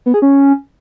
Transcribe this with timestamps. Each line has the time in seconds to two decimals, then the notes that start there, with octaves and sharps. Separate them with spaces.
0.06 B3
0.14 G#4
0.22 C#4